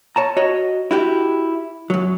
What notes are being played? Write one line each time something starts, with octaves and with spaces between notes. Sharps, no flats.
C#5 A5 A#5
F#4 C#5 D#5
E4 F#4 G4
F#2 F#3